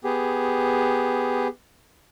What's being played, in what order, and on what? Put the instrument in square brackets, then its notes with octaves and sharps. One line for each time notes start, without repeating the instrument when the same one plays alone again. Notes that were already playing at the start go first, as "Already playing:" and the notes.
[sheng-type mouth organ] B3 G4 G#4